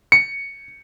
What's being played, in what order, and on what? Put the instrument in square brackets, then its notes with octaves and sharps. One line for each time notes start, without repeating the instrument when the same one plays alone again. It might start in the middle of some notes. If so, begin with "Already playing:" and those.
[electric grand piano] C#7